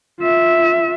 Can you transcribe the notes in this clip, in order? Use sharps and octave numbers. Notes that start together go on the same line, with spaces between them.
F4 E5